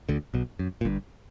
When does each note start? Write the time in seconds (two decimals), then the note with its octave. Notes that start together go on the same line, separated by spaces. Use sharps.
0.09 D2 D3
0.34 B1 B2
0.59 F#2
0.81 A#2
0.85 G1 G2